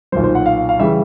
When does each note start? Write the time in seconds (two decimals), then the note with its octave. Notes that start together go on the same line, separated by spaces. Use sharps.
0.12 B1 A#2 F#3 C5
0.24 C5
0.35 F#5
0.46 F5
0.69 F5
0.79 C#3 E3 G3 E5